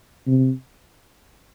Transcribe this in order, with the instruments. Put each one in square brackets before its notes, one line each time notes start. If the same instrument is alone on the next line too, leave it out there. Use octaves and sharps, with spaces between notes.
[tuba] C3